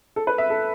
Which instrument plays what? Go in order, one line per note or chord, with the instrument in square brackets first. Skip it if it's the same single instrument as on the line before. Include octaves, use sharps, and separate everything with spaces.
[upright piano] A4
B4
E5
A4